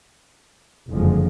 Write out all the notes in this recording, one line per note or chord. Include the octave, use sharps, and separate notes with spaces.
F#1 F2 D3 F3 G#3